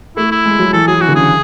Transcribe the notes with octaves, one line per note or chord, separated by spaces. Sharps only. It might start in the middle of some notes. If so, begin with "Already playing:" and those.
A3 E4
E4
G#3
F#3
E3 A4
F#3 G#4
E3 F#4
D3
C#3 G#4